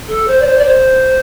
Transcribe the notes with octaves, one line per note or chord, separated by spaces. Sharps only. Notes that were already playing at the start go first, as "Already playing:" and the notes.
A4
C5
D5
C5
D5
C5